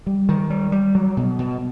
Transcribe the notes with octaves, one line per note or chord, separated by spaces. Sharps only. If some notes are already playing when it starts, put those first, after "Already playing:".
G3
D#3
G3
G3
F#3
B2
B2